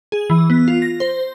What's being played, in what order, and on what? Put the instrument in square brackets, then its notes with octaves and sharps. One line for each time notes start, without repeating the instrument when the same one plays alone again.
[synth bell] G#4
E3
B3
F4
A#6
C5